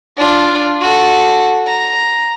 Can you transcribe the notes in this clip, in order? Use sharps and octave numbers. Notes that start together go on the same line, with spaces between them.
D4 F4
F#4 A4
A#5